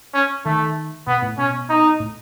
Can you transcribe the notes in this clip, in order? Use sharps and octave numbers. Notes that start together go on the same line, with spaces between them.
C#4
D#3 A3
B2 B3
A2
B2 C#4
D#4
A2